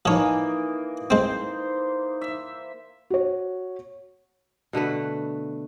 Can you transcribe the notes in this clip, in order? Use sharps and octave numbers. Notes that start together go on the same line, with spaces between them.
E3 F3 A#3 D#4 C#5 D#6
G#3 C4 C5
E5
F#4 C#5
B2 D3 A3 B4